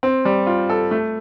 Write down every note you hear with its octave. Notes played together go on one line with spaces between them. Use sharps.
C4
G3
F4
A4
A3